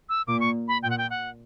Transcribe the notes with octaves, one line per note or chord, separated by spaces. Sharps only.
E6
A#2 D6
C#6
B5
A#2 G5
F#5
G5
F#5